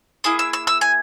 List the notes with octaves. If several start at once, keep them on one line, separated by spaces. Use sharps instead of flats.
A#3 E4 G#4 D#6
E6
E6
E6
G#5